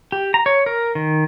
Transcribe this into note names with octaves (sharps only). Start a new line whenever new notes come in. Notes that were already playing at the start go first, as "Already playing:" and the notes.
G4
A#5
C#5
A#4
D#3